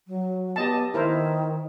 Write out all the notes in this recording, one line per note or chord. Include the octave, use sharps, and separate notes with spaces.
F#3
B3 G4 D#5 A5
D#3 E4 A#4 C5